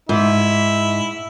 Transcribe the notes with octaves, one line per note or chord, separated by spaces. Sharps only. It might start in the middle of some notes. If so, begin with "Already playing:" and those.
G#2 E4